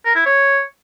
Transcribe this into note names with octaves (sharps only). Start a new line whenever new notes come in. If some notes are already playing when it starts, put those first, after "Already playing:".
A#4
E4
C#5